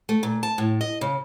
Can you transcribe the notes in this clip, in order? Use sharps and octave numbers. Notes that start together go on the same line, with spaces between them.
A3
A#2
A5
A2
D#5
C#3